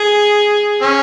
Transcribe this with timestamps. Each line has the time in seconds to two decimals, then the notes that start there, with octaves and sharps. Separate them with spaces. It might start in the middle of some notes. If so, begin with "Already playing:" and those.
Already playing: G#4
0.82 C#4